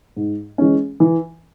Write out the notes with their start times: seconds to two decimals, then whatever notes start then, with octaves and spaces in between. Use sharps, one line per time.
0.16 G#2
0.58 E3 G#3 C#4
1.00 E3